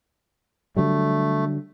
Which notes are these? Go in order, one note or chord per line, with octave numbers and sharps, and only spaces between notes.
D3 F#3 G3 A3